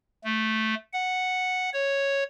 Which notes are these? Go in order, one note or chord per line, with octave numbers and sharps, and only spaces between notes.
A3
F#5
C#5